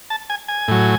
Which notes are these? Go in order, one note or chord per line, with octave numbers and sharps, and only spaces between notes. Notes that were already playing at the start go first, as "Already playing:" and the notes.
A5
G#5
G#5
A2 F#3